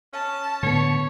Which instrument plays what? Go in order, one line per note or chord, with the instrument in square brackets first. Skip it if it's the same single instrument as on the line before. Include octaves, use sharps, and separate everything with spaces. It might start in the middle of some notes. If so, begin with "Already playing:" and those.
[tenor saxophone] C#4 [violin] A5
[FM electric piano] A2 B3 [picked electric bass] D3 [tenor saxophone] C#5